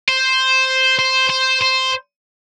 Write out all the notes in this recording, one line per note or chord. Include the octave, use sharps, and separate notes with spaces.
C5
C5
C5
C5